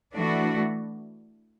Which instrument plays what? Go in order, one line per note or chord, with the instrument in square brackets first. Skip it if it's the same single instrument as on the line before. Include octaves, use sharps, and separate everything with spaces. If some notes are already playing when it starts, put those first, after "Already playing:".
[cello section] E3 A3 D4 F#4